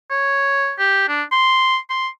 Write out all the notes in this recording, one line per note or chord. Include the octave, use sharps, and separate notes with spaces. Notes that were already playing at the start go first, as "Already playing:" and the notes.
C#5
G4
D4
C6
C6